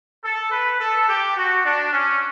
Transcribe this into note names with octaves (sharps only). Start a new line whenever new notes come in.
A4
B4
A4
G4
F#4
D4
C#4